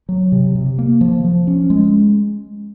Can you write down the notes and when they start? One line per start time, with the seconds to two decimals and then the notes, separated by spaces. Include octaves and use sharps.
0.09 F#3
0.32 C3
0.55 C3
0.78 A#3
1.01 F3
1.24 F3
1.47 C#4
1.70 G#3